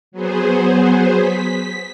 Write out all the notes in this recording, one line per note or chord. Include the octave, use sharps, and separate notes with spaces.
F#3 B3 G#4 C5
B6